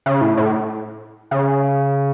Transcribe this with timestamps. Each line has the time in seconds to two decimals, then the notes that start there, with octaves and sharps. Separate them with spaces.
0.06 C#3
0.21 A2
0.37 A2
1.31 C#3